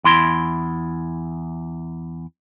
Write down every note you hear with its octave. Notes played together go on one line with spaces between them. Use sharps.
E2 E4 C6